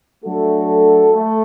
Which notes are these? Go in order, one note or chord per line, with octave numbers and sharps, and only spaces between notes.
F#3 A3 D4 F#4 A4
A3